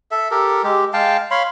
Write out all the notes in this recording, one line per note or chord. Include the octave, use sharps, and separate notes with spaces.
A4 E5
G4 A4 A#4
G#3 G4
G#3 F5 G5 A5
C#5 F5 B5 C6